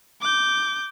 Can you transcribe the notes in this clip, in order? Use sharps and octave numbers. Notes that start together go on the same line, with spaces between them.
D6 G6